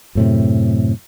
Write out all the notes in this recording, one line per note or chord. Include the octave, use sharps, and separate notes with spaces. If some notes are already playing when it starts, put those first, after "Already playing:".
F#2 A2 C3